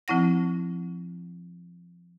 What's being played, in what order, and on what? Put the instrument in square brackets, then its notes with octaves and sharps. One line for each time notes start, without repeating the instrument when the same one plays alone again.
[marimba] F3 C4 E4 F#5 A#6